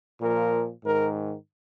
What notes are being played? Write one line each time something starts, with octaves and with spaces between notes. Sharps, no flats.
A#2 F3 A#4
G#2 D#3 A#4